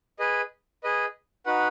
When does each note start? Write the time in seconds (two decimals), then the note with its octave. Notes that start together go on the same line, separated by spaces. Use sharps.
0.19 G#4 B4 D#5
0.84 G#4 B4 D#5
1.46 D#4 F#4 B4 F#5